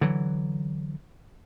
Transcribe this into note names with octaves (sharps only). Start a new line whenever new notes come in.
D3 E3 F#3